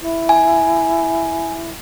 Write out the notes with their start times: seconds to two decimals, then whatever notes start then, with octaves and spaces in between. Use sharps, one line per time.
0.01 E4
0.29 G#5